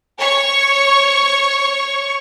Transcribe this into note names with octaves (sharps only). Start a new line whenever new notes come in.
C#5 C#6